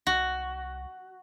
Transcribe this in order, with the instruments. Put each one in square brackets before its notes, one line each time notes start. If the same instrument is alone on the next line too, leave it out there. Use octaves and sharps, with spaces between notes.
[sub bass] C2 [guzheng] F#4